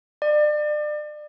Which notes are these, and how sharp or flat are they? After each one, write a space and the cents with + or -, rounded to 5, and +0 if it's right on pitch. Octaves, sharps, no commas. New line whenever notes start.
D5 +35